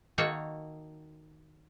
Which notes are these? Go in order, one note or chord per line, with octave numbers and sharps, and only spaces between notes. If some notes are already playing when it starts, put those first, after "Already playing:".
D#3 A#3 D#4 F#4 A4 C#5